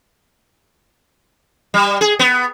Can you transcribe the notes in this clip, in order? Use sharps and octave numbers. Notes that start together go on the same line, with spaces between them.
G3
G#4
B3